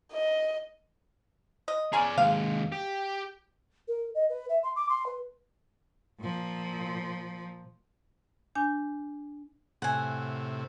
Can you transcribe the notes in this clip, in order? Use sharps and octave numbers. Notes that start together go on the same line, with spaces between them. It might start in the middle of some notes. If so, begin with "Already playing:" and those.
D#5
D#5
C#4 G#4 D5 G#5 A#5
D#2 G#3 F5
G4
A#4
D#5
B4
E5
C6
D6
C6
B4
A#2 F3
D4 G#5 G6
A2 C3 F#5 G#5